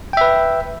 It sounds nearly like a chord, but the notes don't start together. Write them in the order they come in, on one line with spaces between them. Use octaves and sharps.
G5 E5 B4